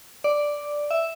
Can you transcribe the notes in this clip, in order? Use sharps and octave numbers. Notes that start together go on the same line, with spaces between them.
D5
E5